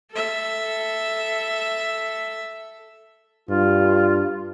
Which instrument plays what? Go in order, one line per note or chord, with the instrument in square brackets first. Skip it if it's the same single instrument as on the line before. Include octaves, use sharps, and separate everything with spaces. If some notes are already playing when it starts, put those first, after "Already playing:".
[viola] A4 E5
[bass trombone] G2 [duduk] F4